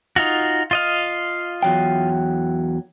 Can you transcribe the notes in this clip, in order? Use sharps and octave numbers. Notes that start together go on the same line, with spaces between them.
D#4 F4 F#4
F4 D#5 F5
E2 F#3 G5